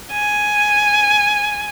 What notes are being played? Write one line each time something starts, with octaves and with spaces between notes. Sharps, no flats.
G#5